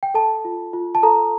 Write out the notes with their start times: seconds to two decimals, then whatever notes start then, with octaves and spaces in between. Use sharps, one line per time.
0.03 G5
0.14 A4 A5
0.45 F4
0.73 F4
0.95 A5
1.03 A4 A#5